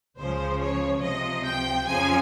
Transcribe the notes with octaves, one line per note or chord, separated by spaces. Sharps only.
C#2 C#3 F3 C5
C#5
C#2 C3 F3 D#5
G5
F2 C#3 F3 G#5